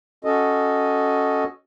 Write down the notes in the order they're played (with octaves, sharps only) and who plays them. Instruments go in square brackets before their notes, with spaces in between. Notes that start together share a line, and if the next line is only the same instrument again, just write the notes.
[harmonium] C#4 F#4 A4 D#5